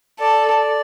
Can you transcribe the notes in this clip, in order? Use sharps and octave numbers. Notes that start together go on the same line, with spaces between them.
A4 D5